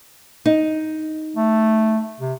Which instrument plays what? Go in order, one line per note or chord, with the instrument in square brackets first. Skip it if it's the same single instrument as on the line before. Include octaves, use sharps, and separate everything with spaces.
[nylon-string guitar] D#4
[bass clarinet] A3
C3